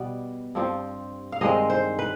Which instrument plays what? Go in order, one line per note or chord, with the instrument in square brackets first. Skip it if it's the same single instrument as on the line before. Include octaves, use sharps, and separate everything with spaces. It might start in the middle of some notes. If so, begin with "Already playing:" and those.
Already playing: [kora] B2 G3 B3 D5
G2 F3 C4
F5
G2 D#3 G#3 C4 D#5
C5
B4